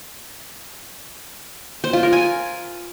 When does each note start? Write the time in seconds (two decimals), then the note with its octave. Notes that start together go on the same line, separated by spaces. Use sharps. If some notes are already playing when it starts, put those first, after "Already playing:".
1.84 C5
1.93 F4
2.03 A#4
2.13 G#5